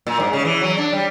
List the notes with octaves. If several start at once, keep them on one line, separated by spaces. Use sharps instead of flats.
A#2
G#2
C#3
E3
F#3
D4
G3